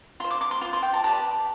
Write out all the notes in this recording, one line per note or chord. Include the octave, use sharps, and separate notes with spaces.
F4 C5 C6
D6
D6
C6
F4 C5 C6
C6
G5
A5
G4 B4 D5 A5